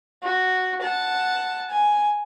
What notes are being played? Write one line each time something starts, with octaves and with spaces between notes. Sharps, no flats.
F#4
F#5 A5
G#5